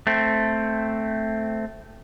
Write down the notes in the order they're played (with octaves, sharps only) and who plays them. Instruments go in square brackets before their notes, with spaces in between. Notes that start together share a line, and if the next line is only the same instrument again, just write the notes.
[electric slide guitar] A3 C4